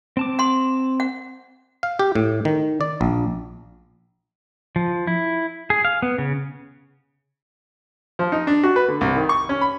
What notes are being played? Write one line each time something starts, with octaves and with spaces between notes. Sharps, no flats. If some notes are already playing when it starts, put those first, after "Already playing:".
C4 A5 D6
F#5 C6
F#5
F5
G4
A2
D#3
D5
A#1
F3
E4
G#4
F5
B3
C#3
F3
D#4
D4
F#4
B4
D3
C2
D#3
C#6
C#4
B5